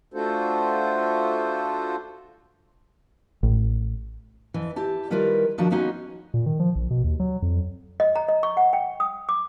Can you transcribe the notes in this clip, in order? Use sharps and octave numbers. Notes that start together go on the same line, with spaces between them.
A3 D4 F4 F#4 A4 C5
A1
F2 E3
E4 G4 A5
D#3 G3 E4 F4 A#4 B4
D#3 F3 D4 E4 F#4
G#3 A#3 B3 C#4 D#4 F#4
A#2
D#3
F3
A#1
B2
D#2
F#3
F2
D#5
A#5
D#5
C#6
F#5
G5
D#6
D6